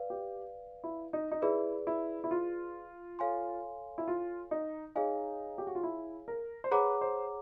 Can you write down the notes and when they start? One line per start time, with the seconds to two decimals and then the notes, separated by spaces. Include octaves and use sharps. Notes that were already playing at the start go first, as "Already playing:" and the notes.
Already playing: B4 D5 F5
0.10 G4
0.84 E4
1.13 D#4
1.31 D#4
1.42 E4 G#4 B4 D5
1.87 E4
2.24 E4
2.31 F4
3.19 A4 C#5 F5 G#5 C6
3.98 E4
4.08 F4
4.51 D#4
4.95 D#4 G#4 C#5 F5 G#5
5.58 G4
5.67 F#4
5.75 F4
5.83 E4
6.28 A#4
6.64 C5
6.71 G#4 B4 C#5 F#5 A#5 D6
7.01 C5